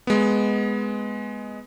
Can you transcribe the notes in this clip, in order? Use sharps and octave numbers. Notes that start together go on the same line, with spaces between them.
G#3 B3